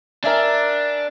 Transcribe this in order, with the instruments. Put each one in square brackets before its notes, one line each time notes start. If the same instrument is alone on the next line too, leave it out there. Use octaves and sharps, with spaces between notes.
[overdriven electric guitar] D4 [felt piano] A#4 E5 G#5